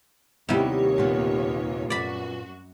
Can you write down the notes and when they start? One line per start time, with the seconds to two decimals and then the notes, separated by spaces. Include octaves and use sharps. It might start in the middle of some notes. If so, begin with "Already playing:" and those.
0.49 D#2 C3 G3 B3 E4 G4 C#5
0.98 A#2 B3
1.90 F#2 F#4 D5 B5